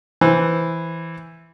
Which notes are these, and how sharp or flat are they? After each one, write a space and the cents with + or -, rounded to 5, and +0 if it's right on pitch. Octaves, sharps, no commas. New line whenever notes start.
E3 +0 C5 +0